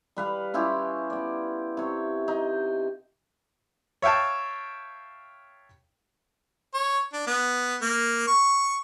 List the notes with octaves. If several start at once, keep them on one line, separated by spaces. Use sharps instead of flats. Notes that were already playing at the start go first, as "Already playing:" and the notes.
G3 B4 F5
C#4 E4 F4 G4
B3 D5
C3 C#5
D#4
C#5 E5 F5 G5 A5
C#5
D4
B3
A#3
C#6